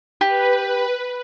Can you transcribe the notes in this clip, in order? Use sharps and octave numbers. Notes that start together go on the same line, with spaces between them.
G4 B4